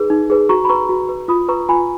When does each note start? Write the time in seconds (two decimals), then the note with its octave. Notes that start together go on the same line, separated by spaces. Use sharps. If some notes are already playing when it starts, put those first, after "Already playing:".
Already playing: D#4 G#4 B4
0.10 D#4
0.30 G#4 B4
0.49 F#4 A#5 C#6
0.65 B5
0.69 B4 A#5 C#6
0.89 F#4
1.09 B4
1.28 F4 B5 D#6
1.48 B4 A#5 C#6
1.69 F4 G#5 B5